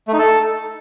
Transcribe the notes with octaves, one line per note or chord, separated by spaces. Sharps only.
A3
D#4
A4